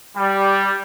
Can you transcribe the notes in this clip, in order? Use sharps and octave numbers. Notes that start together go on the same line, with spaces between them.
G3